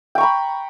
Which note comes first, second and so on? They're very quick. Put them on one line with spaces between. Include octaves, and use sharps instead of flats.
G5 C#6 A#5 B5